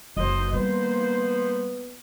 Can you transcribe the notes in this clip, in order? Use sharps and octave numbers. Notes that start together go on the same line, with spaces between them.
F#1 F#3 C5 D#5
G3 A#3 B3 C5